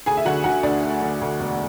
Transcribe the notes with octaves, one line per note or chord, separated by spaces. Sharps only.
D2 G#4 G#5
E5
D3 F#4 F#5
D3 F#4 F#5
D2 D4 D5
A3
D3
D2
E1